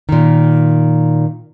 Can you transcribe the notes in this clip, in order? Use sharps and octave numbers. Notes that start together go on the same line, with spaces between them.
A#2 D#3